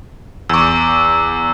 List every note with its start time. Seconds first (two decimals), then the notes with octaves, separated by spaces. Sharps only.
0.49 E2 C#6 D6 E6